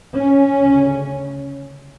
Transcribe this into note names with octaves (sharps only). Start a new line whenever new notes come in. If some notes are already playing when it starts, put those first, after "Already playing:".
C#4
D2 C#3